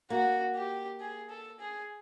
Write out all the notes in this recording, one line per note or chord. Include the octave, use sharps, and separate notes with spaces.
A#3 F#4
G4
G#4
A4
G#4